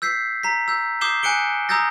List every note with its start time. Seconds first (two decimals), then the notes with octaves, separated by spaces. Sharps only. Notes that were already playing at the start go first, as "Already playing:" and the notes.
0.02 E6 G6 B6 C7
0.43 A#5 B6
0.68 E6 G6
1.01 D6 D#6 G6 C7 E7 G7
1.23 G#5 F#6 C#7 D7 G7
1.69 A#5 D#6 E6 G6 A6 A#6